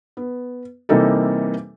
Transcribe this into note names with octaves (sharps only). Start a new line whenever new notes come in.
B3
C3 E3 G3 A#3 D#4 A4